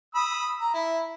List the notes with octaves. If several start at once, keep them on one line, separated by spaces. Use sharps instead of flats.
B5 D#6 E6
A#5
E4